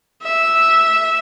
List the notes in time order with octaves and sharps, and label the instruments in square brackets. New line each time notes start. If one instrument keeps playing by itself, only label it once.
[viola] E5